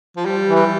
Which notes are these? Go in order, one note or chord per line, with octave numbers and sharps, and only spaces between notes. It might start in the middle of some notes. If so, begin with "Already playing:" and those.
F3
G3
E3
G3